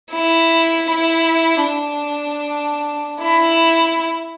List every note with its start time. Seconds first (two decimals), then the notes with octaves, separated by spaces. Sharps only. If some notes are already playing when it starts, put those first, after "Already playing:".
0.12 E4
0.90 E4
1.66 D4
3.21 E4